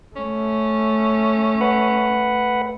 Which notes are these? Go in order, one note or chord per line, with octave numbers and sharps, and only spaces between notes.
A3 C#4
B4 F#5